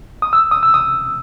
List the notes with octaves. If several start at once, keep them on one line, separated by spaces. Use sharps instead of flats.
D#6
E6
D#6
E6
D#6